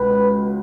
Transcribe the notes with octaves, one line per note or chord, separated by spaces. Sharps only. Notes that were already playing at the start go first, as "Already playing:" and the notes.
Already playing: C#2 B2 G#3 B4